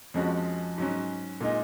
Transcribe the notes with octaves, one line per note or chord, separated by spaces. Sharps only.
F2 F3 G#3 C#4 F#4
G#2 F#3 C#4
A#2 G#3 D#4